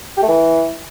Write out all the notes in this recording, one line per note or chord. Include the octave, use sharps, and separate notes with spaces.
G4
A3
E3